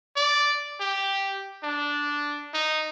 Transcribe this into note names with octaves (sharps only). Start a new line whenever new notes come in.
D5
G4
D4
D#4